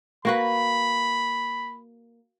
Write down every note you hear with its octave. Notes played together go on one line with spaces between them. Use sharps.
A#3 F#4 B4 B5